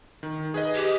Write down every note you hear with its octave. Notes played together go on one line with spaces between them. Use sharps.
D#3
G#4 B4 D#5
G4